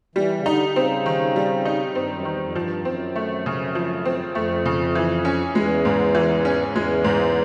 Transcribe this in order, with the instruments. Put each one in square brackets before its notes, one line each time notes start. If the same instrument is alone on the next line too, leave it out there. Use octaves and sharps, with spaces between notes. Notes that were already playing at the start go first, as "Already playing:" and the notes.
[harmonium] E3 [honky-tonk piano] G3
[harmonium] C#3
[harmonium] D3 [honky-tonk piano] D#4
[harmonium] D3
[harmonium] C#3 [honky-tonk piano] C4
[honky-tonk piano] D#3
G3
D#4
[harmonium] G2 [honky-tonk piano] C4
[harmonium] F#2
[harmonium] E2 [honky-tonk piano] D#3
[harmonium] F2
G#2
[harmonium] G2 [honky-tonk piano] F3
[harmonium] F2
[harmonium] F#2 [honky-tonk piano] C4
[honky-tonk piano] A3
C#3
F3
C4
[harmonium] F2 [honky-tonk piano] A3
[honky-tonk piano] C#3
E3
C#4
[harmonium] E2 [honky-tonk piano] G#3
[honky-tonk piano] G#2
E3
C#4
[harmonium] E2 [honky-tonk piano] G#3
[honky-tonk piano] G#2